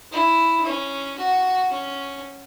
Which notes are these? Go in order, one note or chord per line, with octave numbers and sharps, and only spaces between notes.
E4
C#4
F#4
C#4